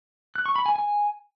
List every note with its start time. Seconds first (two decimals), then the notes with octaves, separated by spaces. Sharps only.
0.36 F#6
0.46 C#6
0.56 B5
0.66 G#5
0.76 G#5